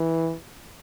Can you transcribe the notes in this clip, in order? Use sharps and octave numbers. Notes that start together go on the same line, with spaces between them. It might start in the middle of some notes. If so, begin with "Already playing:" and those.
Already playing: E3